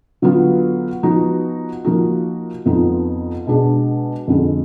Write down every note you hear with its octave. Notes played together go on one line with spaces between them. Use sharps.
D3 F#3 B3 F4
F3 B3 D#4 F#4
F3 A#3 D#4 F#4
F2 F3 B3 D#4
B2 G#3 D4 G#4
F2 D3 G#3